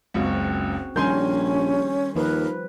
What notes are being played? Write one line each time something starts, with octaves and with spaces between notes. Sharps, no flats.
F#1 C#2 C4 F#4
A#1 D#3 G3 C#4 A#4 G#5 C6 G6
D#2 F3 A#4 B4